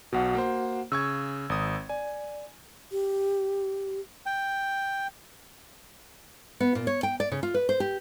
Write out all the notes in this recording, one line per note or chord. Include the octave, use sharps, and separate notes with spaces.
B1 B2 F#4 F#5
A#3 C5
C#3 C#6 E6 G#6
G#1 D#6
D5 G#5
G4
G5
B3
A#2
C#5
G5
D5
C#3
F4
B4
C5
G4